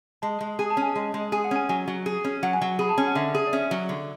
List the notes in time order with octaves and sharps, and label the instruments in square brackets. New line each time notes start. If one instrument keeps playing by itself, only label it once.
[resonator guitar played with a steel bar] G#3 [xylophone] A5
[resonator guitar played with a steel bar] G#3
[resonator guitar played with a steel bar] G#4 [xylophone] G#5
[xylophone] A5
[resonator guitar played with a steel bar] C#4
[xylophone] G#5
[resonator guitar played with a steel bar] G#3
G#3
[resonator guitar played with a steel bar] G#4 [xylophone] G#5
[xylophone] F#5
[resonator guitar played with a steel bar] C#4 [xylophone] G#5
[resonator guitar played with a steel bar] F#3 [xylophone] G#5
[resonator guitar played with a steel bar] F#3
G#4
C#4
[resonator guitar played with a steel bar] F#3 [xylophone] F#5
[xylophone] G#5
[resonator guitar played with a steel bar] F#3 [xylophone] F#5
[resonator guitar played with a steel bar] G#4 [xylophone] B5
[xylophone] A5
[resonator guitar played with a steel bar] C#4 [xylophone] G#5
[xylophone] F#5
[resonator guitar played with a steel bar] D3 [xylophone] E5
[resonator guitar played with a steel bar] G#4
[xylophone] D5
[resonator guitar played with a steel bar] C#4 [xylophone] E5
[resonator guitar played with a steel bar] F#3
D3